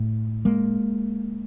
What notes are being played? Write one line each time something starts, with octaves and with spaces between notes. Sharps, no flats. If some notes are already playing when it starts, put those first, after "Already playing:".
Already playing: A2
G#3 A#3